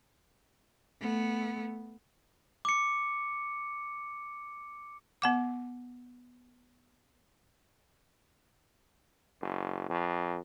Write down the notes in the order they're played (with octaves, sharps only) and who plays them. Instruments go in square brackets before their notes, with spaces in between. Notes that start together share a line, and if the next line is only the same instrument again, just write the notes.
[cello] A3 B3
[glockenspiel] D6 C#7
[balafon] B3 F#5 D6
[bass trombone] F#1
F2